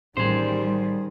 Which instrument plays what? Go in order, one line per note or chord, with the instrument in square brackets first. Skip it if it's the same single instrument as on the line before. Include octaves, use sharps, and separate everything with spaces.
[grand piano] A1 C6 [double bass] D#3 [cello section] G3 [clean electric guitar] G#4 C5